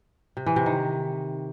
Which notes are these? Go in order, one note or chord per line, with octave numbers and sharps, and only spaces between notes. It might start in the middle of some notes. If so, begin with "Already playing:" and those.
C3
E3
C3
D#3